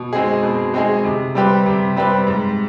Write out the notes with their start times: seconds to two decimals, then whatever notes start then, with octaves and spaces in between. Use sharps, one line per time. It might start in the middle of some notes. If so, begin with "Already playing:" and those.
Already playing: B2
0.13 G#3 C4 D#4 G#4
0.43 B2
0.74 G#3 C4 D#4 G#4
1.04 C3
1.35 G3 C4 G4 B4
1.66 C3
1.96 G3 C4 G4 B4
2.27 G#2